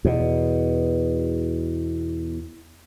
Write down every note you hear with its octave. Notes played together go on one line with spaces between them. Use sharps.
E2 B2